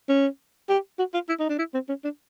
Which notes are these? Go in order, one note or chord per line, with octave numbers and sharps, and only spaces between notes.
C#4
G4
F#4
F4
E4
D#4
D4
E4
C4
C#4
D4